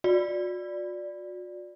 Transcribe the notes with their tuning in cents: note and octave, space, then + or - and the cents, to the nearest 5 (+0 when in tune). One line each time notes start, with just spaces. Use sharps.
F#4 -45 D5 +0